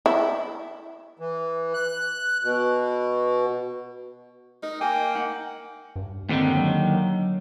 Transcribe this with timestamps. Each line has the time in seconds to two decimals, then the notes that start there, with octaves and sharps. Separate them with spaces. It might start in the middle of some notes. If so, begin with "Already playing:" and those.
0.06 E4
1.19 E3
1.74 F#6
2.43 B2
4.63 D#4 A#4
4.81 A#3 G5 G#5
5.15 D#4 F#5
5.96 G2
6.29 D#2 D3 D#3 C4
6.56 F#3